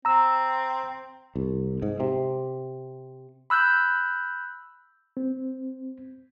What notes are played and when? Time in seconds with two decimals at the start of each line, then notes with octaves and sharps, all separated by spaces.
0.05 C4 A#5 E6
1.36 C2
1.82 G#2
2.00 C3
3.50 B5 E6 F#6 G6
5.17 C4